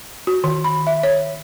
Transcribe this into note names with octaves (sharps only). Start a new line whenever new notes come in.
F#4
D#3
B5
E5
C#5